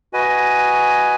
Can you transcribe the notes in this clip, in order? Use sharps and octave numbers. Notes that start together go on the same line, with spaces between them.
F#4 B4 D#5 G#5